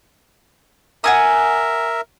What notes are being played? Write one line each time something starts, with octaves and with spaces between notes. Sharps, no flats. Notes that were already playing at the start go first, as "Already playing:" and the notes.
A#4 E5 F#5 G#5 D#6